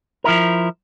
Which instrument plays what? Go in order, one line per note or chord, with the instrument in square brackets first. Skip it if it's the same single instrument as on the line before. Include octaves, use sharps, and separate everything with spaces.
[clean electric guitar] F3 E4 A#4